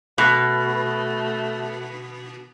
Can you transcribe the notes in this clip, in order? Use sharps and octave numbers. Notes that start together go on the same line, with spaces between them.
B2 A3 F#6 A#6